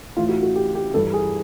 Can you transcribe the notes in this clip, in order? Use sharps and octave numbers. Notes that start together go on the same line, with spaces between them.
A2 E3 F4
F#4
F#4
G4
G4
G2 E3 A4
G#4